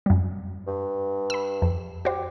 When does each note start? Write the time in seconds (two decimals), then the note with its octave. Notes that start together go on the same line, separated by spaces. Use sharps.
0.06 F#2 G3
0.67 G2
1.30 B5 E6
1.62 F2
2.05 F#4 G4 C5